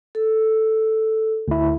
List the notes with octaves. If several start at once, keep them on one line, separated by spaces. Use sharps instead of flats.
A4
D2 E4